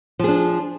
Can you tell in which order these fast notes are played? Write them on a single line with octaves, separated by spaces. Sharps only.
F3 G#4 D4